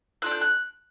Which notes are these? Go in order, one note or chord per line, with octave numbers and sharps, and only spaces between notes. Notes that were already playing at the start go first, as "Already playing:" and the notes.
D4 F4 A4 F#6
G6
F#6